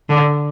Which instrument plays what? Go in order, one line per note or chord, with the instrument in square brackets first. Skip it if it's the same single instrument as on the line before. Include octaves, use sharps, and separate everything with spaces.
[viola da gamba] D3